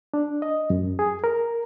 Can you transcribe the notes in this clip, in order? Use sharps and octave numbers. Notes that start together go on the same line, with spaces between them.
D4
D#5
F#2
G#4
A#4